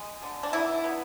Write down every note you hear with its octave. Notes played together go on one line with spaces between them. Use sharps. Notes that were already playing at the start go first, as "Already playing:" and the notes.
Already playing: G#3
D3
D4
B2 E4
B3